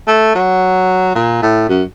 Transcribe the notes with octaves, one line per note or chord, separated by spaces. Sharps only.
A3
F#3
A#2
A2
F#2